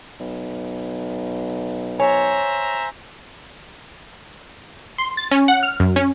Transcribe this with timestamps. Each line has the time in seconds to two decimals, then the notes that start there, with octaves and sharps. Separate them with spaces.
0.20 B1
2.00 C5 C#5 E5 G#5 A#5
4.98 C6
5.17 A6
5.31 C#4
5.48 F#5
5.63 F6
5.80 F#2
5.96 C#4